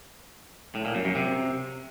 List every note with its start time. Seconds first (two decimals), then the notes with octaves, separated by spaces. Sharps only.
0.75 A2
0.85 A#2
0.95 F#2
1.05 F#2
1.15 C3